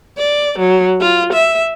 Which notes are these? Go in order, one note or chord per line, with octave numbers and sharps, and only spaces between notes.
D5
F#3
F4
E5